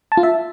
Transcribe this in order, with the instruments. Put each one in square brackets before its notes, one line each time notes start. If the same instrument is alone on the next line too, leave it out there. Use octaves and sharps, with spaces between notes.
[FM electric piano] A5
F4
E5